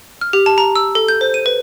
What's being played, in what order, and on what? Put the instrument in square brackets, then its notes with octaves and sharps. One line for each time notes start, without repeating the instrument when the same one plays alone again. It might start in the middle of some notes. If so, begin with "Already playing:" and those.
[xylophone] F6
G4
A5
A#5
E6
A4
G6
C5
D#7
B4